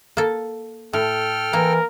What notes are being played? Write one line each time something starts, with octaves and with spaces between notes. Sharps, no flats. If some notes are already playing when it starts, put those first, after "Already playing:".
A#3 A4
A2 A4 G5 F6
E3 A#3 A#4